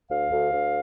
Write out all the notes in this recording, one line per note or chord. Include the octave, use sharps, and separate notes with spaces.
D2 F5
D2
D2